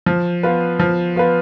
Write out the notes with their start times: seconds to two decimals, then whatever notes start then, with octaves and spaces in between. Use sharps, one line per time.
0.06 F3
0.43 B3 F4 B4
0.80 F3
1.16 B3 F4 B4